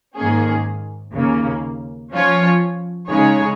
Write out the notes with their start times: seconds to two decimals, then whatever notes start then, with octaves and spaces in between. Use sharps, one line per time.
0.16 G#2 D#3 A#3 C#4 G#4
1.13 D#2 C#3 A#3
2.12 F3 C#4 F4 C#5
3.08 C#3 G#3 D#4 G#4 C#5